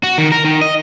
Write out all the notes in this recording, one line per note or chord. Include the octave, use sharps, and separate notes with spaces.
F#4
D#3
A#4
D#3
D#5